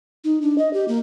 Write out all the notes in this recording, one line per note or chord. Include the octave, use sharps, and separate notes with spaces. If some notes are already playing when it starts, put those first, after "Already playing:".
D#4
D4
D#5
G4
A#3